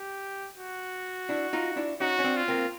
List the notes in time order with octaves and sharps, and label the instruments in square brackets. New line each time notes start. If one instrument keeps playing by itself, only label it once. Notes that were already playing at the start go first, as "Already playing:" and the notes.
Already playing: [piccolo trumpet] G4
F#4
[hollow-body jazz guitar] D4 E4
D#4 F4
D4 E4
[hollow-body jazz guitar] C#4 D#4 [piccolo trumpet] F#4
[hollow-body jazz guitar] C#4
C4 D4
[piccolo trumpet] F4
[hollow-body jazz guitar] A#3 C4